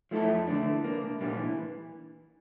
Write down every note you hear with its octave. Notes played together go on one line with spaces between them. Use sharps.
F3 A3 E4 A4
F2
D3 A3 D4
E3
A#3 D4
C2
A#2 G3 A#3 D4
E3